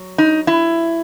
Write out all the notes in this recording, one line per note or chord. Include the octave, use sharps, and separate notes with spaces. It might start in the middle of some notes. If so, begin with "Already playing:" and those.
Already playing: F#3
D#4
E4